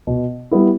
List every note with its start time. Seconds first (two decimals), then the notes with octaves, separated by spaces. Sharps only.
0.07 B2
0.51 G3 B3 E4